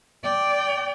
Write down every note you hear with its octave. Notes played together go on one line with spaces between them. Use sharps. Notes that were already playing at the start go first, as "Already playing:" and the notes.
D5 G5